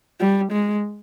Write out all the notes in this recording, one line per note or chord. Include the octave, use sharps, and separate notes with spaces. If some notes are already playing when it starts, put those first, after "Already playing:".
G3
G#3